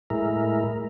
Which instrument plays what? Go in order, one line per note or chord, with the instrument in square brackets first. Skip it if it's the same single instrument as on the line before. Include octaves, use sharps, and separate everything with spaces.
[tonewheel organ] A2 G#3 E4 A#4